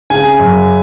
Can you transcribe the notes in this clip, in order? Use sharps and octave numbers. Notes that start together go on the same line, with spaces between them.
C#3 G#5
F#2